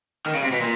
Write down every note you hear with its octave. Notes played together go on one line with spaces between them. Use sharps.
D#3
C#3
C3
B2
A#2